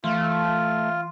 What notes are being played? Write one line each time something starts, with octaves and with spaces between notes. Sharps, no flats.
E3 A3 F4